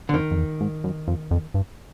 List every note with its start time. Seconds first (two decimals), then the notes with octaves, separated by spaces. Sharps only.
0.09 D3
0.14 F2 D#3
0.31 F2
0.37 E2
0.61 G#2
0.84 F#2
1.08 F2
1.31 F2
1.54 G2